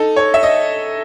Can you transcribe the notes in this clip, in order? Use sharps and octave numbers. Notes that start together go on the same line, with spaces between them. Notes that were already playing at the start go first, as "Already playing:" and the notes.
Already playing: D#4 A4
C#5
E5
D#5